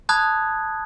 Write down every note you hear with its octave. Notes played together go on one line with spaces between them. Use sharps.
A5 B5 D#6 F#6 G#6